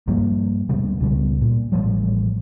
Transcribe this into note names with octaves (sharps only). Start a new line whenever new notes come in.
G2 F3 G3 A#3
D2 B2 G3
C#2 B2 G3
A#2
A1 B2 F3 G3